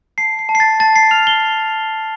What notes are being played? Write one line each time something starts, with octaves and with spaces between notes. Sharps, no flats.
A5 C7
C7
A5
C7
A6
A5 A6
C7
F6 F7
G7